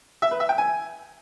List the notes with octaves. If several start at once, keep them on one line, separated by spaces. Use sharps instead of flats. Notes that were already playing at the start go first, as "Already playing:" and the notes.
E5
B4
E5
G5
G#5